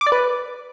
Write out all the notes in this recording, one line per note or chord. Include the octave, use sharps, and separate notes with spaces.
D6
D5
B4